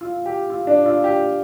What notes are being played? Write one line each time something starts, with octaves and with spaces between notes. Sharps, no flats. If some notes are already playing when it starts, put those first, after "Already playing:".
F4
G4
F4
D4
F4
G4